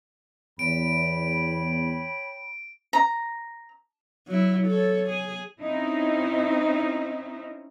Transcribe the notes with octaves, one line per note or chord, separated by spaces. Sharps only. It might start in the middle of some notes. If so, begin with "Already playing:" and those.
E2 C#5 G5 B5 D7
A#5
F#3 E4
A4 C#5
G#4
C4 C#4 D#4 E4